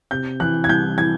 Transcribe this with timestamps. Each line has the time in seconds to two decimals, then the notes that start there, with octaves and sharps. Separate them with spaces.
0.11 C3 G6
0.40 E3 F#6
0.64 G#6
0.69 C2 G6
0.98 E3 G#6